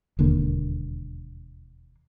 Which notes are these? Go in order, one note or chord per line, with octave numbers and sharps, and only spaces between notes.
E1 D#2 D3 A#3